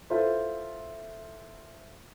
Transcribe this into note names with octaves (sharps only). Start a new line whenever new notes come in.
E4 F4 A4 B4 C5 E5